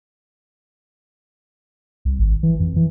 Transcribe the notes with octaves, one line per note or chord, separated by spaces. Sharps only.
C2
G#1
E3
F2
E3